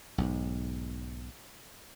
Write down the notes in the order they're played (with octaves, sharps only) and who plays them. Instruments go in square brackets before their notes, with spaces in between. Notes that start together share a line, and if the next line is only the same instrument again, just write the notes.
[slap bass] B1 G#2